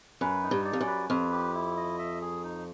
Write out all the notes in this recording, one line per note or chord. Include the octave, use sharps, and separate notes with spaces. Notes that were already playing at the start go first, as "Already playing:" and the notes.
F#2 B4
D#4
G2
D5
F2
F#2
B4
F2 B4
G4
E4
D#5
E5
G#4
D#4